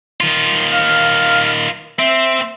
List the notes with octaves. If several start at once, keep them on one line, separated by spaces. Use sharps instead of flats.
D#3 F4
F5
C4 E5